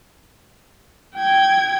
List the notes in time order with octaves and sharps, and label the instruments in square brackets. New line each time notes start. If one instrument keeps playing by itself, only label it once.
[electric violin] G5 G#6